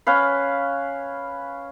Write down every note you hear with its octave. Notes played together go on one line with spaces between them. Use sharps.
C#4 B4 F5